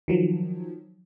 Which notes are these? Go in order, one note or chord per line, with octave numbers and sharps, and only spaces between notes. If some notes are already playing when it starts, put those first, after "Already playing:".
D#3 F3 F#3